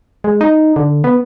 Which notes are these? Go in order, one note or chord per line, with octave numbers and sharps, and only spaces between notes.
G#3
D#4
D3
B3